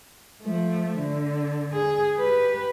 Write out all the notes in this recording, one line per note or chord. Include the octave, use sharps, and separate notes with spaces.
F3 A3
D3
G#4
G4 B4